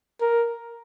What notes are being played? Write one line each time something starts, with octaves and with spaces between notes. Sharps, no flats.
A#4